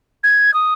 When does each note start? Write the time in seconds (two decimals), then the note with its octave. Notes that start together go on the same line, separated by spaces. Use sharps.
0.23 G#6
0.54 D#6